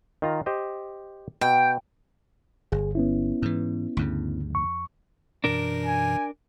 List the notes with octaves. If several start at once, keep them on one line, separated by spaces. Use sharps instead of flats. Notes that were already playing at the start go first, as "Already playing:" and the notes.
D#3 F4 A#5
G4 C5 D#5
B2 G5
G1 G#4
B3 C#4 E4
G#2 E3
D2 G2 C#3
F2 C#6
F#2 B2 E3 D4 A#4
G#5